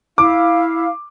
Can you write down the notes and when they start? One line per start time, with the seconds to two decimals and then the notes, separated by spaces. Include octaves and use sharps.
0.18 E4 F5 D6